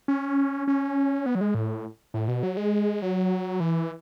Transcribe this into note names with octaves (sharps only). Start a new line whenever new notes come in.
C#4
C#4
B3
F#3
G#3
A2
A2
B2
F#3
G#3
F#3
E3